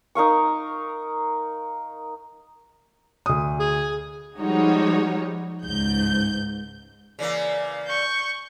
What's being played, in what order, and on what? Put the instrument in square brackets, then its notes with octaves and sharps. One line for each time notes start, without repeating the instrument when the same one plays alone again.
[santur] D#4 A#4 F5 C#6
[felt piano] D2 D#6
[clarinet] G#4
[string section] F3 G3 G#3 D#4 F#4 C#5
C#2 G#2 G6
[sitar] C#3 E3 A#3 [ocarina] D5
[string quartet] C#6 G6